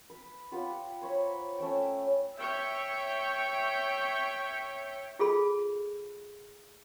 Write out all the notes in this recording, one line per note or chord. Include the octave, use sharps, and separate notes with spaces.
B4
F4 G4 B4 F#5
C5 C#5 A#5 B5
A3 C#4 E5 G5
C#5 E5 G5
F4 G#4 A4 B5